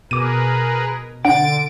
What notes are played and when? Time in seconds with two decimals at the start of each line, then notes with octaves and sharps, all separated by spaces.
0.11 B2 G#4 A#4 B4 D6 D#7
1.25 D3 D4 F#5 A6 D7